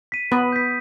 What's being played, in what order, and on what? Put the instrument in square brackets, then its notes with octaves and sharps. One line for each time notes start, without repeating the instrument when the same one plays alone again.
[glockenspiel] B6 D#7
[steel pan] B3 B4 [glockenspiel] D#6
[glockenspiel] G6 B6